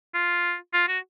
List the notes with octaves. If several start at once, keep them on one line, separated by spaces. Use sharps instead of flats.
F4
F4
F#4